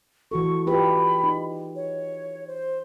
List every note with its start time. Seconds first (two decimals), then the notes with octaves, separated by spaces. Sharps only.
0.31 E3 F#4 A4 C#6
0.67 F4 G4 B4 B5
1.24 D#4
1.75 C#5
2.47 C5